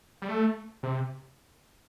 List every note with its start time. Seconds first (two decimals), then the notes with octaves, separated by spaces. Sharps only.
0.22 G3
0.29 A3
0.83 C3